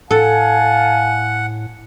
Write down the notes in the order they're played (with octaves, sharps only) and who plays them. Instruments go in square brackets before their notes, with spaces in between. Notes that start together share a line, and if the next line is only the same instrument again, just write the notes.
[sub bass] A2 [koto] A4 [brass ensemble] F5 G#5 A5 [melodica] F#5